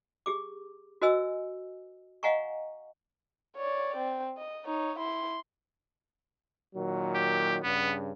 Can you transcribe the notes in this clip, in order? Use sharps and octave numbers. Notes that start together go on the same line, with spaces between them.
G4 G#4 D6
F#4 A#4 C5 D#5 G#5 E6
D#5 F5 F#5 G#5 A#5 C#6
C#5 D5
C4
D#5
D#4 C#5
E4 C6
A#2 D#3 F#3
G4
G2 C#3 B3